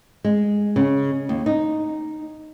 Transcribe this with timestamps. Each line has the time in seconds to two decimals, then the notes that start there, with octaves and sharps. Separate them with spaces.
0.25 G#3
0.76 C#3
1.29 D#2
1.46 D#4